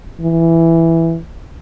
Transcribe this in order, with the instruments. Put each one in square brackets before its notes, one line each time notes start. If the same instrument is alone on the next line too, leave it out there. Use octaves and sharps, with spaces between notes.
[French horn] E3